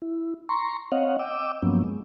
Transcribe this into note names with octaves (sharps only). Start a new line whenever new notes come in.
E4
A#5 C6 C#6
C4 C#5 D#5 F5 F#5
D#5 G5 D6 E6
G2 F3 F#3 A#3 B3 C#4
G#3